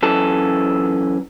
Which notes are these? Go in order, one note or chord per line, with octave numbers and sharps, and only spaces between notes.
F#2 E3 A4